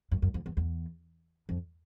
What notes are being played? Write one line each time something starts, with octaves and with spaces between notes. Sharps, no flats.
F#2
F#2
F2
E2
E2
F2